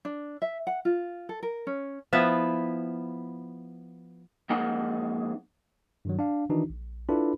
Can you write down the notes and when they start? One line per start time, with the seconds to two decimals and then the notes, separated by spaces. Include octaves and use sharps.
0.05 D4
0.42 E5
0.67 F#5
0.85 F4
1.29 A4
1.43 A#4
1.67 C#4
2.13 F3 B3 E4 B4
4.50 F2 G#3 A#3 D#4 F#5 A#5
6.05 G2 D#3 F#3
6.19 D4 F5
6.49 D#3 E3 D4 D#4 F#4
6.70 A#1
7.09 D4 E4 F4 A4 B4 B5